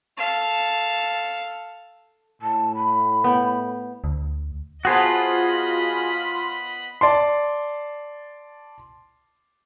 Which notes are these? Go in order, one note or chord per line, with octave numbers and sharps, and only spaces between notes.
A4 F5
A2 A5
B5
B3 G5
D2
B3 F4 F#4 G#4 C5 D#5 A5 B5
D5 A5 C6